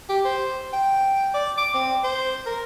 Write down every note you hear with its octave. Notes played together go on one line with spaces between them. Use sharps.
G4
C5
G5
D5
D6
C4
C5
A#4